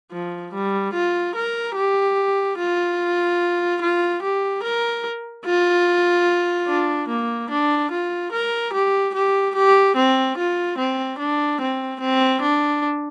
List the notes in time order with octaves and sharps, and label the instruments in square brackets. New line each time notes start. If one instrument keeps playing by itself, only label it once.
[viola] F3
G3
F4
A#4
G4
F4
F4
G4
A#4
F4
D4
A#3
D4
F4
A#4
G4
G4
G4
C4
F4
C4
D4
C4
C4
D4